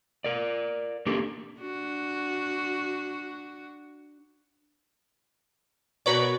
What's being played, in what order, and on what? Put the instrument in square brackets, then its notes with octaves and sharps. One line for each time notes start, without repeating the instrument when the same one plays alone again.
[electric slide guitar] A#4 D5
A#3 C#4 D4 G4 A4 A#4
[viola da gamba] D4 F#4
[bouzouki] B2 A#4 C#5 [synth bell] F#4 B4 D5